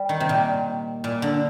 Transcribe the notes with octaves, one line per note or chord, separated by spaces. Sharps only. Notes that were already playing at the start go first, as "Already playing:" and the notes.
Already playing: G3
D#3
C3
A#2
A#2
D3